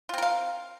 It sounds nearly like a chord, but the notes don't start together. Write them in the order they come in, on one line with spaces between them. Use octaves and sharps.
F4 C4 A#4 F5